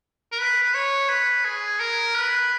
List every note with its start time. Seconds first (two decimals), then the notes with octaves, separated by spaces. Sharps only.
0.32 A#4
0.39 B4
0.63 B4
0.75 C#5
1.09 B4
1.45 G#4
1.80 A#4
2.15 B4